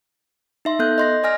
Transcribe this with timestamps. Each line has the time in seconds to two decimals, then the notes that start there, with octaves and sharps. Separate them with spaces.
0.65 D#4 E5 C6
0.79 B3 A4 F#6 G6
0.98 D#5 C6 A#6
1.23 D5 D#5 G#5 F6 A#6